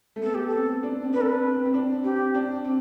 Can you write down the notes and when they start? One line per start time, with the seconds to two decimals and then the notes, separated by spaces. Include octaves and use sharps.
0.16 A3
0.22 B3 A4
0.35 G4
0.47 A4
0.53 C4
0.83 D4
1.03 C4
1.13 D4 B4
1.21 A4
1.29 B4
1.43 C4
1.65 C4
1.74 D4
2.04 C4 G4
2.34 D4
2.65 C4